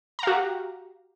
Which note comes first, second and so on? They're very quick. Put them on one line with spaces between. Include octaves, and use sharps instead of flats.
A#5 F5 F#4 G4